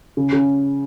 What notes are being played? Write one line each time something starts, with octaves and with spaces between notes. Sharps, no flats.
C#3
C#3